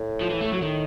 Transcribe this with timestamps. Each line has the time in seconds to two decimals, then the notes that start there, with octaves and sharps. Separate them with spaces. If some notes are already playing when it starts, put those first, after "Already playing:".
Already playing: A2
0.21 F3
0.30 E3
0.41 A3
0.52 F#3
0.61 A2 D#3